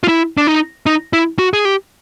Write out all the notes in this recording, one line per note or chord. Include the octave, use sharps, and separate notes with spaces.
F4
E4
D4
D#4
D#4
E4
F#4
G#4
G4